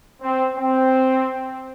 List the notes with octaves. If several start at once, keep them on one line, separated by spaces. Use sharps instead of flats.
C4
C4